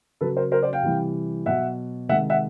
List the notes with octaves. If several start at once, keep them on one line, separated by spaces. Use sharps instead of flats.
C#3 F#3 A4 B4
A#4 C5
A#4 C5
C5 D5
F5 G5
C3 E3 G3
B2 F#3 E5 F#5
C3 D#3 G#3 E5 F#5
E5 F#5